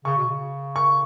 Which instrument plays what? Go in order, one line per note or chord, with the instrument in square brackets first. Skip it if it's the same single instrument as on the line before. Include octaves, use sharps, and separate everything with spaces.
[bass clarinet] C#3 [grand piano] C#6
[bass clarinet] B2
C#3
[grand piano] C#6